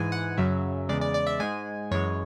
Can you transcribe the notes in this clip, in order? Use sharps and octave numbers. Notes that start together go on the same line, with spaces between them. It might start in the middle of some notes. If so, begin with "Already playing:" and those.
Already playing: G#2 E3 G#3 G#5
F#5
F#2 C#3 F#3 E5
E2 C#3 G#3 D5
D5
D5
E5
G#2 G#3 G#5
F#2 E3 G#3 C#5